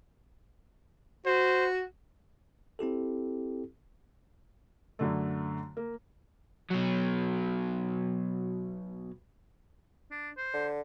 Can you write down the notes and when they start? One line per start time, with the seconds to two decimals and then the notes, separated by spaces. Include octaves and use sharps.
1.26 F#4 C5
2.79 C4 E4 G4 A4
4.99 F#2 D3 A3
5.77 A#3
6.70 B2 F#3
10.11 D4
10.37 C5
10.54 D3